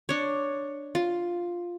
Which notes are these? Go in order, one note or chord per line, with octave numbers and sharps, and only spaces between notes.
D4 C#5
F4